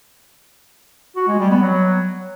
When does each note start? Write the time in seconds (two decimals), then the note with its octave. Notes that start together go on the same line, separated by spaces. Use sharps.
1.16 F#4
1.28 G#3
1.39 G3
1.51 B3
1.62 F#3